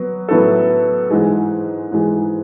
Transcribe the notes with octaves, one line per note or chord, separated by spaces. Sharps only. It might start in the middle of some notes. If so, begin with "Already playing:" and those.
Already playing: F#3 B3
A2 F#3 B3 E4 A4
G#2 E3 G#3
G#2 E3 G#3